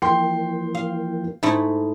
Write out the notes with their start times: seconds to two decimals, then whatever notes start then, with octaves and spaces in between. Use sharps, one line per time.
0.02 E3 F3 A#3 G5 C6 C7
0.75 F5
1.43 G#2 A3 E4